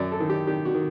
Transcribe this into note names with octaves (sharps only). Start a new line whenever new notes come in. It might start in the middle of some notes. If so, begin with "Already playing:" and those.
Already playing: F#2 D5
A4
D#3
G4
D#3 G4
F#4
D#3